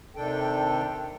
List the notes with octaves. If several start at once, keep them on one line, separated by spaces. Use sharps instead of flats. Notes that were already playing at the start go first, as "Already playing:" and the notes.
C3 D#3 D4 A4 G5